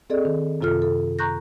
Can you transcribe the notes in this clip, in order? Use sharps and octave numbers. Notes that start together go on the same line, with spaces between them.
C4 G#4 A4 D5 D#5
D#3
F#2 C3 F4 A4 F6
A4
A#5 C#6 F#6 G6 A#6